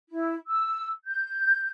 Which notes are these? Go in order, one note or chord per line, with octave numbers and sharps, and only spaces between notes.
E4
E6
G6